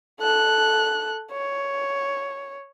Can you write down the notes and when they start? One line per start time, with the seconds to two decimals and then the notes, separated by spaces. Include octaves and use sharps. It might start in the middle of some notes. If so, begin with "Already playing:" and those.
0.20 A4 F#6
1.32 C#5